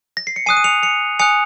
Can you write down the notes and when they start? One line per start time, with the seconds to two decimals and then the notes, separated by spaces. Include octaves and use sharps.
0.17 A#6
0.27 C7
0.36 C#7
0.46 G#5 D#6 F#6 C7 D#7
0.57 D#7
0.64 C#7 F7
0.83 C#7 F7
1.19 G#5 D#6 F#6 C#7 F7